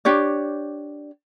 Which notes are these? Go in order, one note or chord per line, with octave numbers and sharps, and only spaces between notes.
D4 G4 C#5 D5